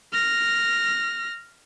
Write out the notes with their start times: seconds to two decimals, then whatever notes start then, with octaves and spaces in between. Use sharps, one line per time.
0.12 F6 A#6